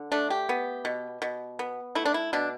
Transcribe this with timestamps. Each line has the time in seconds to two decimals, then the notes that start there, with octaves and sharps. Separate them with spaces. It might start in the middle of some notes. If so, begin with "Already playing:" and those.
Already playing: D3
0.12 A3 D4
0.30 G4
0.49 B3
0.85 B2
1.22 B2
1.59 B3
1.95 A3 E4
2.05 D4
2.14 E4
2.33 B2 D4